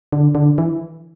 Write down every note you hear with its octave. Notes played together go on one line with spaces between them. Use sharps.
D3
D3
E3